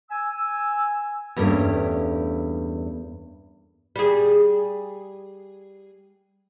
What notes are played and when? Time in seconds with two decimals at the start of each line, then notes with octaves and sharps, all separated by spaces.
0.11 G#5 E6
1.36 E2 G2 A3 A#3 C#4
3.96 G3 G#4